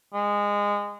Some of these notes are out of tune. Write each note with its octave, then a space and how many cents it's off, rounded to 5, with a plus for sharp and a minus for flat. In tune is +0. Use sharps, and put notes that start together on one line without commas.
G#3 -20